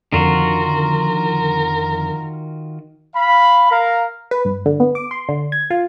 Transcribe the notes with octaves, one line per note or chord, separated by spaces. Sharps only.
F2 D3 D#3 F4 F#4 A#4
F5 B5
A#4 F5
B4
G2
D3
B3
D6
C6
D3
G#6
F4